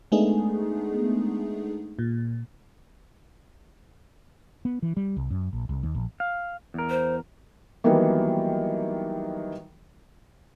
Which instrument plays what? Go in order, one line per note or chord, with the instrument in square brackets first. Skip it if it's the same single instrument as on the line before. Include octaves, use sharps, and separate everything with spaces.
[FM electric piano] G#3 A3 B3 D4 D#4 G#4
A#2
[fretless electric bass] B3
E3
G3
C2
F#2
A#1
C2
D#2
A#1
[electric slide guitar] F5
E2 A#4
[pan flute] C5
[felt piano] D#3 E3 F#3 G3 A#3 B3